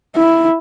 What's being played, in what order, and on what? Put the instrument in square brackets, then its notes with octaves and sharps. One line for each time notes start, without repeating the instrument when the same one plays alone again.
[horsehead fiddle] E4